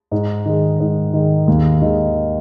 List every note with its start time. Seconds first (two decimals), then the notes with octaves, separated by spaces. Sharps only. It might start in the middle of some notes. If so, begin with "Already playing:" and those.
0.11 G#2
0.46 D#3 G#3
0.80 G#2
1.14 D#3 G#3
1.48 D#2
1.82 D#3 G#3